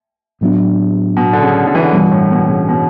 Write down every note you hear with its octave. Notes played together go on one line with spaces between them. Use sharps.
A2 F#3 B3 D4
B2
D3
C#3
D3
E3
D3
G2 B2 E3 G3
A2
B2
B2
C#3
B2